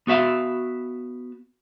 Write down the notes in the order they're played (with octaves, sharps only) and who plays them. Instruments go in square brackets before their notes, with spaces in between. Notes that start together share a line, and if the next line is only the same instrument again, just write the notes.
[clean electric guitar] B3 F#4 E5 F5